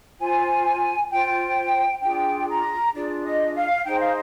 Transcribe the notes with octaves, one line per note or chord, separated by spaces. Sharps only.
F4 C5 G#5
F4 C5 G5
D4 F4 G#4 G5
A#5
D4 F4 G#4 D5
D#5
F5
D#4 G#4 C5 G5
F5